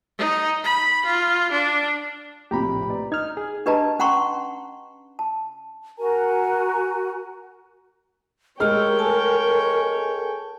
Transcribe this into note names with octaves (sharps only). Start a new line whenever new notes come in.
D#4
B5
F4
D4
A#1 A2 C3 G4 A#5 B5
B4 D5
D#4 F6 G#6
G#4
D4 G4 B4 D#5 A5 A#5
C#4 F#5 G5 A#5 C6 C#6
A5
F#4 A#4 G#5 A#5
G#3 A3 G4 A#4 C#5 G5 E6 F6
A4 G#5 A5